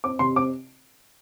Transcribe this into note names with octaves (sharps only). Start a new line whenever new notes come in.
C4 D6
C3 C6
C4 D6